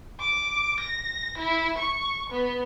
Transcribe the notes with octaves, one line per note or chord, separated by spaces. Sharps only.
D6
A#6
E4
C#6
B3